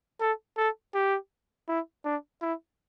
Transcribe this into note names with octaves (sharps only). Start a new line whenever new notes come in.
A4
A4
G4
E4
D4
E4